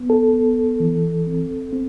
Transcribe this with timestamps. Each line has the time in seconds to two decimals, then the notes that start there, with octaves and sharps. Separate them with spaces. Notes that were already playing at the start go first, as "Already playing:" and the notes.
Already playing: B3
0.10 A4
0.33 B3
0.80 E3
1.27 C4
1.73 C4